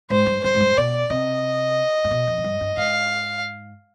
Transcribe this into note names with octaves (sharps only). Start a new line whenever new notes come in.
G#2 C5
G2
G2 C5
G#2
G2
B2 D5
C3 D#5
G#2
B2
F2
G#2
G2
G2
G#2 F5